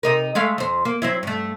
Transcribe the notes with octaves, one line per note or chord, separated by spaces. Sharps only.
C3 D#4 A#4
G#3 A3 F5
F2 C5
A#3
F#3 C4 E4
G2 A3